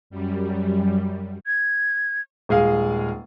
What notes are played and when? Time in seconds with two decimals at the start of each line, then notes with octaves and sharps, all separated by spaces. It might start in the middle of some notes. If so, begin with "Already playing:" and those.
0.10 F#2 G3
1.46 G#6
2.49 D#1 G#3 G#4 F5